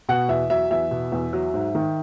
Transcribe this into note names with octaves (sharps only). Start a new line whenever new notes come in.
B2 F#5
E2 E5
F#3 E5
E2 E5
B2
E2
F#3
G#2
D#3